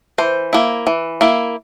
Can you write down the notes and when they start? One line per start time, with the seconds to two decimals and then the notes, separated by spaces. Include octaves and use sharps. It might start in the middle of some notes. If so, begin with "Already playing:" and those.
0.18 E3 C5
0.53 A#3 E4
0.87 E3
1.21 A#3 E4